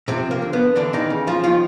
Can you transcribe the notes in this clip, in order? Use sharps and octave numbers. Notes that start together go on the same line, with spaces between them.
C3 F3 C4
A#3
D3
B3
D3 E3 D4
D#3 D#4
C#3
F3 F4
D#3 F3 F4